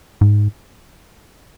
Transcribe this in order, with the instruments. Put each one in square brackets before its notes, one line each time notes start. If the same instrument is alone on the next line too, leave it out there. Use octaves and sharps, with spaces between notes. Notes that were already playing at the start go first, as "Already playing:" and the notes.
[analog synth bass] G#2